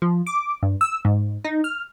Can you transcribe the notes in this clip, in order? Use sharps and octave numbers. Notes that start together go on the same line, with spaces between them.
F3
D6
G2
E6
G#2
D#4
F6